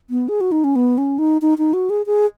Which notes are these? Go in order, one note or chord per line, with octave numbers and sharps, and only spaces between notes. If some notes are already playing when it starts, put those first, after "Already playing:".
B3
G#4
F#4
D#4
C#4
B3
C#4
D#4
D#4
D#4
F#4
G#4
G#4